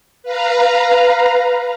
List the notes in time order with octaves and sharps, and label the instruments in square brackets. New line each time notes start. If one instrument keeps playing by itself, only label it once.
[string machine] B4 F5 A#5